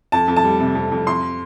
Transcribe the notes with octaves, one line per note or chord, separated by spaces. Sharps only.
F2 A5
F2
A5
G3
C3
F2
F2
F2 C6